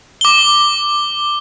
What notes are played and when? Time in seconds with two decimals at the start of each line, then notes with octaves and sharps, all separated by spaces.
0.21 D6 G7